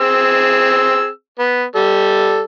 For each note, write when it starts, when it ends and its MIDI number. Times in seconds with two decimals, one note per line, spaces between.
0.01 1.08 60
0.01 1.08 68
0.01 1.08 88
1.39 1.64 59
1.76 2.42 55
1.76 2.42 69